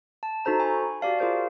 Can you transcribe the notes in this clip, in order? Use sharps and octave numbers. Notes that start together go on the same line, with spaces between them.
A5
D#4 F#4 A4 C5 A#5
G#5 B5 C#6
F#4 G4 D5 F5 A5
F4 G#4 A#4 C5 F5